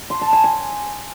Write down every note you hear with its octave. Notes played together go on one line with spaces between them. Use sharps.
C6
A5
G#5
G#5